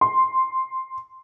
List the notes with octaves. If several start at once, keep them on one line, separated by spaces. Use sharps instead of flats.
C6